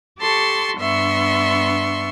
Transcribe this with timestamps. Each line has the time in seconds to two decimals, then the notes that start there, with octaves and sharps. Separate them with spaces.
0.19 G4 A4 A5 C6 C#6
0.78 G2 B3 D4 E5 C6 C#6